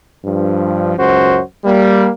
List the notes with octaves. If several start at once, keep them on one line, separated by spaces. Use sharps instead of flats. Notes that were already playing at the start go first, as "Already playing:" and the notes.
G2 F3
C#2 F#2 F#4 C5
G3 A#3